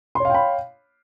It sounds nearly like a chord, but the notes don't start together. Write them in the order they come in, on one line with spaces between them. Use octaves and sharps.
C6 C#5 F5 G5 B5